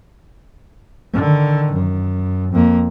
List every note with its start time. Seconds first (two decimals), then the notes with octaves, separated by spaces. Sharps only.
1.14 D3 D#3
1.72 F#2
2.52 F2 A#3